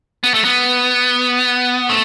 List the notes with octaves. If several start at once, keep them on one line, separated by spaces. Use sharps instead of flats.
B3
A3
B3
A3